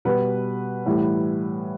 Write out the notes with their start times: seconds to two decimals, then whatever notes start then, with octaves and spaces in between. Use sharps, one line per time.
0.05 B2 G3 B4
0.86 A2 E3 G3